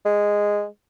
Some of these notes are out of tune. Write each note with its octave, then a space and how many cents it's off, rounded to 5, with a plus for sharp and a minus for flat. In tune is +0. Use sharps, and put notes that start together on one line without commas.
G#3 -10